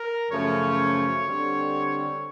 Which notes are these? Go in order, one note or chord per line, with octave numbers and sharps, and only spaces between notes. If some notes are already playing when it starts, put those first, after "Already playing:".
Already playing: A#4
F#2 C#3 F3 A3 C#4 C#5
D3 G3 C4